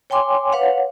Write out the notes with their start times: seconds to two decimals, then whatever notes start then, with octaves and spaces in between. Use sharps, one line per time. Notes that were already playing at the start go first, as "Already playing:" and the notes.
0.10 C#5 G5 G#5 C6 D6
0.52 B4 C#5 F5 F#5